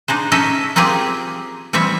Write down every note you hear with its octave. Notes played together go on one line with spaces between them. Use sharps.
D4 D#4 G#4 C5
C#4 D#4 A4 D#5 E5
A#3 C4 F4 G4 G#4
E3 G3 C4 C#5 E5